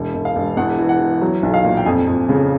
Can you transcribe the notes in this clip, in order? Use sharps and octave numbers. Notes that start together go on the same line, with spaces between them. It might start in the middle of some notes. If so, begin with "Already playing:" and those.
Already playing: E1
E1
F5
E1
E2 F#5
E3
F#5
E3
F#3
B1
F5
A#2
G5
F2 G#5
F2
C#3